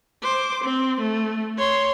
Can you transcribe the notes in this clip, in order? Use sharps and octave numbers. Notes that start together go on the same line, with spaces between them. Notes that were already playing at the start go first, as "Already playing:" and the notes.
C5 D6
C4
A3
C#5 C6